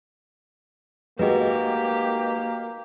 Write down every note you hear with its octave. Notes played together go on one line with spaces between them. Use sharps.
G#3 A#3 D#4 F#4 G4 B4 D#5